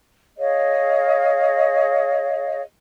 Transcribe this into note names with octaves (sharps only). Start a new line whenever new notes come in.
G#4 C#5 D#5 F5